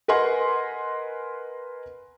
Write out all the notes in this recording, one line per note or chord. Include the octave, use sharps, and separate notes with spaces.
A#4 B4 D#5 F#5 G#5 C6